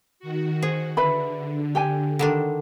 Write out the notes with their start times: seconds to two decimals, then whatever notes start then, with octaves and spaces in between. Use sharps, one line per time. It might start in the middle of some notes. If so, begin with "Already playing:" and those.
0.19 D#3 F#4
0.63 G#4 C5
0.97 D3 B4 E5 B5
1.75 G4 G5 G#5
2.19 D3 D#3 D4